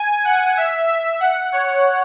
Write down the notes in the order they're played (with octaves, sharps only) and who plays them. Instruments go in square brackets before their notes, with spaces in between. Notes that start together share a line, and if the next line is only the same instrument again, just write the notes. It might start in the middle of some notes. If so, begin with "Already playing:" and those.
Already playing: [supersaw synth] G#5
F#5
E5
E5
F#5
C#5